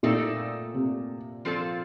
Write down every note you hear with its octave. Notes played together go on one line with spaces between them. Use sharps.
A#2 A3 C4 D#4 A4 D5
C3
F3 C4 F4 A4 D5